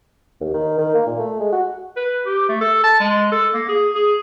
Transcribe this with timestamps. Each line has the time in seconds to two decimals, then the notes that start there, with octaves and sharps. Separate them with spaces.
0.41 D#2
0.54 D#3
0.78 D#3
0.94 A#3
1.06 A#2
1.19 A3
1.40 G#3
1.52 F#4
1.96 B4
2.26 G4
2.49 A3
2.61 A4
2.84 A5
3.00 G#3
3.32 A4
3.54 A#3
3.69 G#4
3.95 G#4